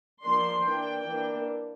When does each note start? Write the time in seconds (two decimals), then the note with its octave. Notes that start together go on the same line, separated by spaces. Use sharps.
0.22 F3 A#3 D4 C6
0.63 E3 A#3 D4 G5
1.05 E3 A#3 D4